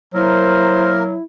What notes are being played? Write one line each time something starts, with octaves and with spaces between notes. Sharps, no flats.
F#3 A#3 E4 A#4 C5